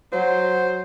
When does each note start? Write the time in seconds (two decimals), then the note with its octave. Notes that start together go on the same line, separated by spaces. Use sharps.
0.13 F#3 C5